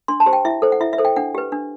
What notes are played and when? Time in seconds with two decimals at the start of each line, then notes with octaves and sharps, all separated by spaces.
0.08 D4 C6
0.20 A5
0.26 G4 C5
0.33 G5
0.45 E4 E5
0.62 A4 C5
0.72 F#5
0.80 E4 E5
0.93 E5
0.98 A4 C5
1.05 G5
1.16 D4 F#5
1.35 G4 B4
1.52 D4